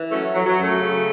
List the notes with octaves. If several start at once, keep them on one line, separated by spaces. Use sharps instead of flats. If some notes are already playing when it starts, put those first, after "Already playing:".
Already playing: E3
F#3 A3 C#4
F#3
F#3
F#2
A3
C#3